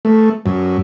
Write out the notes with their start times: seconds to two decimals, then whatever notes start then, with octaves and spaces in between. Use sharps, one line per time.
0.05 A3
0.46 F#2